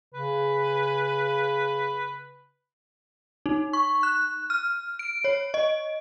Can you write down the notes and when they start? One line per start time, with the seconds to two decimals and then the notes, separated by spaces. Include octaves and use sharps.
0.14 C#3 B4
3.46 D#4
3.73 C#6
4.03 F#6
4.50 F6
4.99 D7
5.24 C#5
5.54 D#5